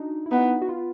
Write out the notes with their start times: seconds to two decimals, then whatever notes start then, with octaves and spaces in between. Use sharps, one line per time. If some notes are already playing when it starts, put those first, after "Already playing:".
Already playing: D4 D#4 F#4
0.26 E4
0.31 B3 D#4
0.62 F#4
0.69 F4